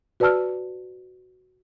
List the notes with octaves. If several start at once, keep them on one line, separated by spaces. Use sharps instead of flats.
F#4 B4 D5 A5 E6 F6